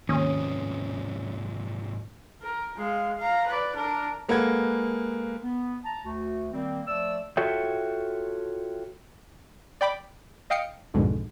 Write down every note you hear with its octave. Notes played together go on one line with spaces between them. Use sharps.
D#2 G#2 C3 F3 C#4 D#6
A#4
G#3 F5
F5 A#5
B4 D5
D4 A#4
G#3 A#3 A4 B4 F#5 G#6
B3
A5 A#5
D2 A3 F#4
D#3 G3 A#3 C4
F3 A3 D5 E6
F4 F#4 A4 C#5 E5 G5
D5 G5 B5 D6
D#5 F5 G5 D#6 C7 C#7
B1 F2 G#2 B2 D3 G#3